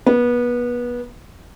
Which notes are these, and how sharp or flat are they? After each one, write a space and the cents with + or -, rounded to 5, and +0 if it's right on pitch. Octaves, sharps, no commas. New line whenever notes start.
B3 -25